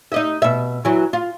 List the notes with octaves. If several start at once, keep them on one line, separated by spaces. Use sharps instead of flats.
D#4 D#5 E5
B2 E5
E3 F#3
F4